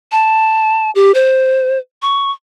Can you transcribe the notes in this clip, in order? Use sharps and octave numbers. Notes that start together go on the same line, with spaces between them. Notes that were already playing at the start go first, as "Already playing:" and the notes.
A5
G4
C5
C#6